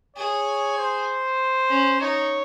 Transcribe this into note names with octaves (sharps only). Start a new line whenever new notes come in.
G#4 C#5
C5
C#4
D#4 C#5